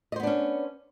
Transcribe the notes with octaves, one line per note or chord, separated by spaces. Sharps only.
B3 C#4 D4 C5 D#5